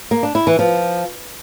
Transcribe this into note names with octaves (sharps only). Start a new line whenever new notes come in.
A#3
D4
E4
E3
F3